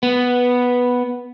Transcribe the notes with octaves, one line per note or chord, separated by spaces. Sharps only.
B3